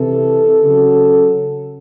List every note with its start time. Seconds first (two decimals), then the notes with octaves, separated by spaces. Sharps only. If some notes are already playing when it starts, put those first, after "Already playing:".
Already playing: C3 E3 A4
0.63 C#3 F#3